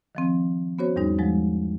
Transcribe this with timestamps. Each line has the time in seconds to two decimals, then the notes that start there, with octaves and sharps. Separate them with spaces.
0.15 D#3 F3 C4
0.79 B3 C#4 F#4 C5 C#5
0.96 E2 G#2 G3 D#4
1.19 F3 F#3 G#3